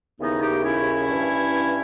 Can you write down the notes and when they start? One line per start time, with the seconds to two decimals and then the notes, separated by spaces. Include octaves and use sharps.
0.19 D#2 C#3 E3 B3 D#4
0.41 D#4 G4
0.63 C#4 E4
1.07 G2 E3